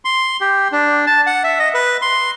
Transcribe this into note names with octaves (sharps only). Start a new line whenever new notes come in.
C6
G4
D4
A5
F#5
E5
D#5
B4
C6